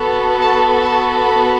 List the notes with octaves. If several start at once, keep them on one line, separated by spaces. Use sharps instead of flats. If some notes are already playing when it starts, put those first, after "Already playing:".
Already playing: B3 F#4 A4
A5
A5
B5